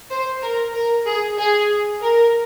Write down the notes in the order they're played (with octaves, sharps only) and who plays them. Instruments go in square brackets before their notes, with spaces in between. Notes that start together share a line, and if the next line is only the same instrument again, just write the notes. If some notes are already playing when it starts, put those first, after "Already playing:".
[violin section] C5
A#4
A#4
G#4
G#4
A#4